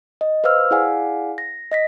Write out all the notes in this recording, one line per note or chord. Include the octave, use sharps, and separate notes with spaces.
D#5
B4 C5 F5 E6 F6
E4 G#4 D5 F5 F#5 G#5
A#6
D#5 A#6 B6